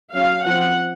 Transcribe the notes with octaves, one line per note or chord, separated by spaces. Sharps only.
F#3 C#4 F5
F3 C4 F#5